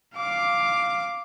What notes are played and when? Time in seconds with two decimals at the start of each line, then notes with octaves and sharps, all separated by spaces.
0.16 F5 D6